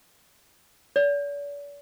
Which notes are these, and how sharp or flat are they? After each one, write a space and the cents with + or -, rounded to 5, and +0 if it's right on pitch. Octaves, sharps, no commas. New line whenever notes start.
D5 -45